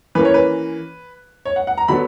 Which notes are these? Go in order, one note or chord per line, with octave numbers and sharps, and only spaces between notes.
E3 A#3 C#4 B4
C#5
B4
C#5
F#5
F#5
A#5
D3 F#3 B3 D4 B5